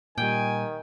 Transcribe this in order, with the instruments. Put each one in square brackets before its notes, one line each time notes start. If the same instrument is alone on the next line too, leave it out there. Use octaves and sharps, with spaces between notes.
[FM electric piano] A#2 G3 [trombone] D#3 [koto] G5 [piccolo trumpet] G#5